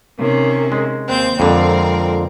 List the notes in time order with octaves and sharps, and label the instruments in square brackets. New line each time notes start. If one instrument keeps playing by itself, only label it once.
[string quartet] C3 D#3 C#4
[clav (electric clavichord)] G#3
[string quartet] D#2 C4 G6
[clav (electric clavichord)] F2 D3 [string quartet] G#3 C4 A#4